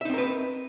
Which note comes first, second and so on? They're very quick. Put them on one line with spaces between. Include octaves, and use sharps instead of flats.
E5 D#4 C4 A#4 B4